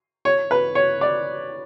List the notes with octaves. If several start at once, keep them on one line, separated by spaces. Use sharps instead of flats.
C#5
B4
C#5
D5